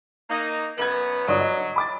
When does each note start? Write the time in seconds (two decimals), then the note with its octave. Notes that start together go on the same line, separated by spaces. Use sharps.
0.30 A#3 D#4
0.78 F#2 B3 G#6 F#7
1.28 G1 F#3 D5 D#6
1.40 D#5
1.76 B5 D6 A6